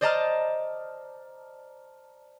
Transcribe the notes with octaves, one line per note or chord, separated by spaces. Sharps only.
C5 D5 D#5 A5 A#5 F6